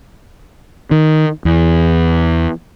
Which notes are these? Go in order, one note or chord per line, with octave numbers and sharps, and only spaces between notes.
D#3
E2